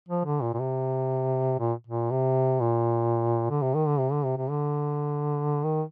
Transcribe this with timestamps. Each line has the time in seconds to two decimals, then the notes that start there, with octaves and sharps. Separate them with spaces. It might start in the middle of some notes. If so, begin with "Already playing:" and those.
0.09 F3
0.25 D3
0.42 A#2
0.54 A#2
0.60 C3
1.60 A#2
1.87 A#2
2.11 C3
2.61 A#2
3.51 D3
3.62 C3
3.75 D#3
3.88 D3
4.00 C3
4.12 D3
4.25 C3
4.38 C3
4.50 D3
5.64 D#3